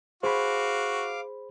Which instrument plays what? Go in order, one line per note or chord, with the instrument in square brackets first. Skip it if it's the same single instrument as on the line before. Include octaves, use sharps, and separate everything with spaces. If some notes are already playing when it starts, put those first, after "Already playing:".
[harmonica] F#4 [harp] G#4 [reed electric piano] C5 B5 [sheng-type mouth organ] F5 D6